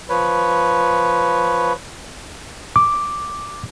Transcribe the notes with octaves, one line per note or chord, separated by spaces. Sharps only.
F3 B4 C#5
D6